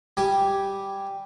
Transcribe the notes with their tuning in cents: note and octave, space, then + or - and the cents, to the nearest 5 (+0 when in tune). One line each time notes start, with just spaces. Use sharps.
G3 +0 G4 -5 G#5 +0